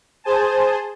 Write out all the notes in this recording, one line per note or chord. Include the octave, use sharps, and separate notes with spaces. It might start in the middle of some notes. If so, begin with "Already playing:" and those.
G#4 C5 G#5 A5